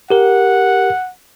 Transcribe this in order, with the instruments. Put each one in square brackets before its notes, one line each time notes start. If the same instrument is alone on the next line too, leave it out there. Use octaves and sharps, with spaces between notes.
[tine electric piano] G4 A#4 [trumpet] F#5